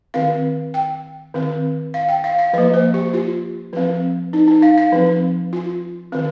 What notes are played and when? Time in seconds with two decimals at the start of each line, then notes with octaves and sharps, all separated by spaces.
0.14 D#3 C4 F5
0.74 G5
1.34 D#3 C4
1.94 F5
2.09 G5
2.24 F5
2.39 F5
2.53 F3 D#5
2.58 A#3
2.74 C5
2.94 G4
3.13 F4
3.73 F3 C4
4.33 D#4
4.48 D#4
4.62 F5
4.78 F5
4.92 F3 C4
5.53 F4
6.12 D#3 C4